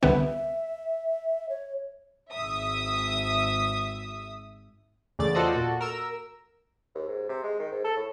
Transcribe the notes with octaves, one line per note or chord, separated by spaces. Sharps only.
C2 D3 B3 E5
C#5
G#1 E5 D#6
E2 C#3 A3 D5 A6
F4 F#4 A4 C5 D5 D#5
A#2 F#4 A4
A#4 E6
D#2
G#2
C3
G#3
D#3
G#2
A4
A2